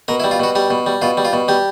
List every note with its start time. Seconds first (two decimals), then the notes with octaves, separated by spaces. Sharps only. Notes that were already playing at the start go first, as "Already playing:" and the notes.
0.08 B2 A#4
0.20 E4
0.24 G3
0.31 F4
0.40 B2 F#4
0.55 G3 G4
0.70 B2
0.86 G3
1.02 B2 F4
1.17 G3
1.25 F4
1.33 B2
1.48 G3 G4